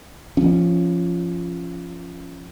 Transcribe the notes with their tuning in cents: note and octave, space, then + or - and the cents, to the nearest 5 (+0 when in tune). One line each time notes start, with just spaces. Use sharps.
F3 -15 C#4 -5